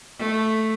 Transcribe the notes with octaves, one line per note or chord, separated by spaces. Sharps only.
A3